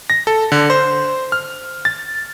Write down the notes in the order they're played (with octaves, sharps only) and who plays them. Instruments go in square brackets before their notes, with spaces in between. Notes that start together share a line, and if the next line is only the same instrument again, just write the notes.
[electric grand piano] A#6
A4
D3
C5
F6
A6